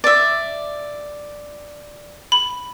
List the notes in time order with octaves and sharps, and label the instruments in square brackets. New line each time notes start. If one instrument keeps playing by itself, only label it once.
[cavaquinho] D5 E5
[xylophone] B5